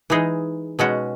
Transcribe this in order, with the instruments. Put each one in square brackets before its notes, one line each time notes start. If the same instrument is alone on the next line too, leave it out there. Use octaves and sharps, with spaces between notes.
[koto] E3 G#3 D#4 G#4
B2 G#3 C#4 F#4